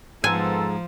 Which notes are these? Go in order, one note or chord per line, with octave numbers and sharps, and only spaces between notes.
G#2 F3 G#3 B3 C4 A4 G#5